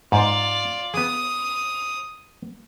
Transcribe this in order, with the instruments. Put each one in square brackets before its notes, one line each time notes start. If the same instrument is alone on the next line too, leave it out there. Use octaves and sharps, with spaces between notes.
[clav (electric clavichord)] G#2 [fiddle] F4 D5
[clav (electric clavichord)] B3 G#4 [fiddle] D#6